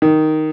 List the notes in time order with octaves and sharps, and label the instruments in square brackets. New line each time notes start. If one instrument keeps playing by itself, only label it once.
[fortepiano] D#3